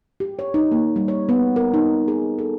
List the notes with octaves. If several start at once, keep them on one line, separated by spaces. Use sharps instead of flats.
G4
C#5
D#4
A#3
G3
C#5
B3
A#4
D#4
G#4
A4